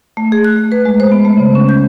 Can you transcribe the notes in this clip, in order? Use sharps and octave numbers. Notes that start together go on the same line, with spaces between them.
A3
G#4
F#6
A3
B4
G#3
C5
B3
A3
C#3
C#4
G6